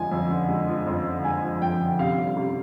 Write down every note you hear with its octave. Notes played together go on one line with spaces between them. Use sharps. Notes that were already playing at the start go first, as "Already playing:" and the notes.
Already playing: F2 D3 F3 G#3 G#5
F2
D3
G#3
F3
F2
D3
G#3 G#5
F3
F2 G5
D3
C3 F5
G3
C3